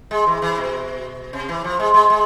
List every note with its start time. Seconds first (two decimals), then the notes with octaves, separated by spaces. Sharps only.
0.11 G#3
0.26 E3
0.42 E3
0.57 B2
1.33 C3
1.49 E3
1.64 F3
1.80 G#3
1.94 G#3
2.10 G#3